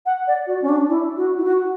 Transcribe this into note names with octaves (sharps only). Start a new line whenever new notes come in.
F#5
D5
F#4
C#4
D4
E4
F#4
E4
F#4